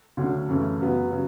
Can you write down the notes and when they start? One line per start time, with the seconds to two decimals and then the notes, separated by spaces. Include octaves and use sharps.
0.17 D2 D3 F#3 C#4 F#4
0.48 F#2 C#3 E3 A3 C#4
0.80 F#2 C#3 F#3 B3
1.11 C#3 F#3